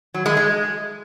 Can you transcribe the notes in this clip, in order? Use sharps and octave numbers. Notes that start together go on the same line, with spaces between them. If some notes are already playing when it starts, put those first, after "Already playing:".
F#3
G#3
G#3